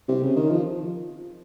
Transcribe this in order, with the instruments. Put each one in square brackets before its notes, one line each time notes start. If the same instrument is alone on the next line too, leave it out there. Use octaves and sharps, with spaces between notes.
[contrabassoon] C3
C#3
D#3
F3